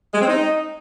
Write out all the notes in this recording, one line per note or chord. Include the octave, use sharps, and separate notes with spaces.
G#3
C4
D#4